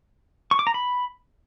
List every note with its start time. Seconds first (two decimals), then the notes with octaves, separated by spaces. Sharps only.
0.51 C#6
0.59 D6
0.67 A#5
0.74 B5